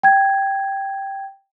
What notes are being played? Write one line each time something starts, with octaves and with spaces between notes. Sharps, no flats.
G5 G#6